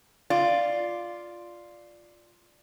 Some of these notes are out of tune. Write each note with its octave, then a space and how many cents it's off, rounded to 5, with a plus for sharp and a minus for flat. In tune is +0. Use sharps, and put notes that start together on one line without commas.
F4 +0 D5 +0